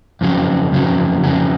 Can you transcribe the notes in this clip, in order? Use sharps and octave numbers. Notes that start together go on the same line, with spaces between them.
F2 C#3 F#3
F2 C#3 F#3
F2 C#3 F#3